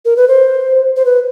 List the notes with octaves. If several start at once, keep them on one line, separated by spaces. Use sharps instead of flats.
A#4
B4
C5
C5
B4